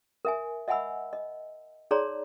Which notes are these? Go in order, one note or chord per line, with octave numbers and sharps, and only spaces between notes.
A#4 E5 G#5
D#5 E5 F#5 G#5 B5 E6
D#5
D#4 G#4 C#5 D5 A#5 C6